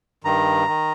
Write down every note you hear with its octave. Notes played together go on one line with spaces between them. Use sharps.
G2 D#3 A#5
D#3